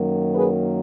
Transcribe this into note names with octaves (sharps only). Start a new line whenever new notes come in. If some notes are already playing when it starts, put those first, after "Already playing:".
Already playing: F#2 D#3 F#3 A#3
G#4 B4